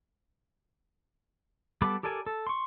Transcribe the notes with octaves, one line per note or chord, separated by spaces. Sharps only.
G3 B3 A4 B5 D6
G4 A4 A#4 D5 G#5
A4
C6 C#6